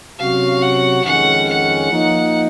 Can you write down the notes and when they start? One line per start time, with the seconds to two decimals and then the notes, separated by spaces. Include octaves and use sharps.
0.18 C3 F#3 C#4 F#4 F5
0.62 F#5
1.04 F2 D#3 G#3 C#4 F#5
1.48 F#5
1.90 F3 A#3 D#4